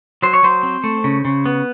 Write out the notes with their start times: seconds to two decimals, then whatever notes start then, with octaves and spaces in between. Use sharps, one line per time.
0.22 F#3 C5
0.33 C#5
0.43 F#3 C5
0.63 C4
0.84 A3
1.04 C#3
1.25 C#3
1.46 B3